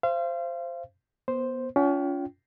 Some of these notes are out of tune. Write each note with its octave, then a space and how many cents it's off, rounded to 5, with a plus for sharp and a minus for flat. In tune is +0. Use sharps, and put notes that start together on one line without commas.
C5 +0 F5 -35
B3 -20 C5 +0
C#4 +35 F4 +0 G5 -20